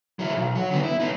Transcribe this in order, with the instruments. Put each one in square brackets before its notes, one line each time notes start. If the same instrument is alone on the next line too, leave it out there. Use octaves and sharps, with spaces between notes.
[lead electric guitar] F#3 E4
B1
F#3
D3 B3
E4
B3 D#4